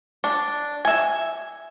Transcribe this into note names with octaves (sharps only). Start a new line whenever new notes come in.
D4
E5 G#5